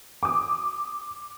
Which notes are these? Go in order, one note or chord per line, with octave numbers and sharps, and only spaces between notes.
D6 D#6